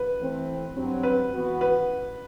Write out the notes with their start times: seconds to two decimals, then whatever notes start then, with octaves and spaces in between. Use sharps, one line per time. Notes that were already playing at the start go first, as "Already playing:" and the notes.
Already playing: B4
0.20 E3 A3 C4
0.75 G2 F#3 C4
1.03 B4
1.33 E3 B3 F#4
1.61 B4